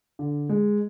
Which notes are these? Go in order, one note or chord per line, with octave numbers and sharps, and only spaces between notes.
D3
G#3